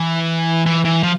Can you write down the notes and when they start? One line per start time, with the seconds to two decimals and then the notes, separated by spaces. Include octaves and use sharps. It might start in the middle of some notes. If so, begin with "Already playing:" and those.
Already playing: E3
0.66 E3
0.85 E3
1.03 F3